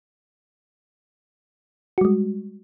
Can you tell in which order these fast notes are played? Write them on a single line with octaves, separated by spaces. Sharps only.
F#4 G3 G#3